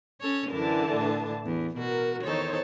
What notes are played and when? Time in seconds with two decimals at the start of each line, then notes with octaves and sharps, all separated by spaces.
0.21 C#4 A4 C#5
0.50 F#2 D3 E3 E4 A#4 A5
0.92 A2 D4
1.45 E2
1.77 B2 F#4 A#4
2.23 E2 D#3 D#4 A4 C5 C#5